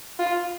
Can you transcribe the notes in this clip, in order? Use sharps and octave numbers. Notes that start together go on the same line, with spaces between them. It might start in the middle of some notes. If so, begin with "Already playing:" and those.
F4